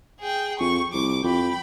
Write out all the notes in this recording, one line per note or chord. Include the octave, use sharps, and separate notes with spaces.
G#4 G5
F2 C#6
C2 D6
F2 G5 B5